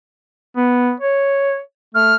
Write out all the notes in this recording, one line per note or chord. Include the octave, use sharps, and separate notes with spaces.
B3
C#5
A3 F6